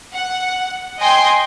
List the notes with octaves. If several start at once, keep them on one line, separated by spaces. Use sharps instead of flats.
F#5
D#5 G5 G#5 C6